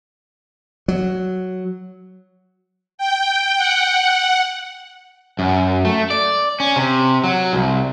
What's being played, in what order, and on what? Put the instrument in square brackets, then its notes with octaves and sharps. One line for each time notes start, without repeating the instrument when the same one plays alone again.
[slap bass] F#3
[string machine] G5
F#5
[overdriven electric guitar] F#2
A3
D5
C#4
C3
F#3
C2